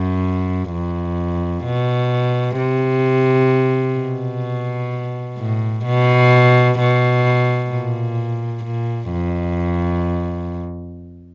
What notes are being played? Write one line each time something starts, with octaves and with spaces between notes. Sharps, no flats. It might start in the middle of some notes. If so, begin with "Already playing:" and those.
Already playing: F#2
F2
B2
C3
B2
A2
B2
B2
A#2
A#2
F2